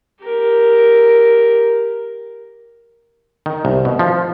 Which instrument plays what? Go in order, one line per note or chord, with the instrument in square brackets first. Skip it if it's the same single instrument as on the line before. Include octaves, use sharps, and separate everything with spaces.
[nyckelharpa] G4 A#4
[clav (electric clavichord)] D#3
C2
B2
F3